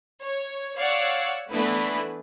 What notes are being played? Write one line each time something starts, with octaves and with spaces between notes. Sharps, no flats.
C#5
C#5 D5 F5 F#5 C#6 E6
E3 A3 B3 D4 E4 B4